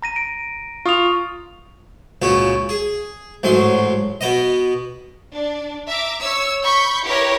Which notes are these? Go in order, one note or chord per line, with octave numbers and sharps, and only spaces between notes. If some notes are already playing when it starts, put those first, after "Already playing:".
A#5 A#6 D#7
D7
F4 C#6 D#6 F7
C#2 A#2 C#4 F#4
G#4
A1 G#2 F#3 C6
B2 B3 D#5
D4
E5 A#5 D6
C#5 E6
B5 C#6 G6
E4 G4 A#4 B4 C#5